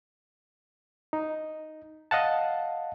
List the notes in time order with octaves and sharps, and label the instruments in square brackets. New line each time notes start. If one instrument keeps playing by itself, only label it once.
[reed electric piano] D#4
D#5 F5 F#5 A5